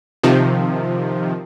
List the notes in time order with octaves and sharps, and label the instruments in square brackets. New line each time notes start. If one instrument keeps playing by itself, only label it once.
[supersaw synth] C3 D#3 F3